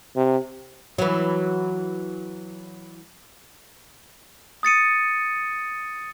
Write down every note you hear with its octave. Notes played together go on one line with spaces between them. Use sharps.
C3
E3 F#3
D#6 A6 C#7 D#7